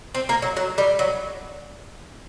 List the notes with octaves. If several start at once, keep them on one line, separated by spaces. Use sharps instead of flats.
C4
A#3
F#3
F#3
G3
F#3